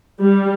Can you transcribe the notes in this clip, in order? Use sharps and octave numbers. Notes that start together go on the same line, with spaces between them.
G3